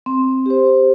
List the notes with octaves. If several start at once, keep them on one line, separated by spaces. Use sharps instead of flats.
C4
G4 C5